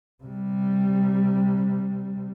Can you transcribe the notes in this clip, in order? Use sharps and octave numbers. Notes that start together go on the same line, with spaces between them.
C3 G3